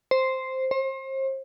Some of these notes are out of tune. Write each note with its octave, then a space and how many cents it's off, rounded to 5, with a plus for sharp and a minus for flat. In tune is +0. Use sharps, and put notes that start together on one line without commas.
C5 +0
C5 +35